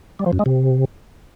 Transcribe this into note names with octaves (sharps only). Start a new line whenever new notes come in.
G3
F3
F#2
G#3
C3